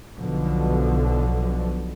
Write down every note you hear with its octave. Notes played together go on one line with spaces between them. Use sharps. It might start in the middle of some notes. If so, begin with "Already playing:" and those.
B1 B2 D3 F3